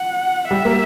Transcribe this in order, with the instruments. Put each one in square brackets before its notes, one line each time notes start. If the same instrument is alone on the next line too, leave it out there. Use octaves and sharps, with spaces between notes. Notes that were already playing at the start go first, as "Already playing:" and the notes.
Already playing: [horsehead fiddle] F#5
[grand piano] G3 [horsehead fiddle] E5
[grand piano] A#3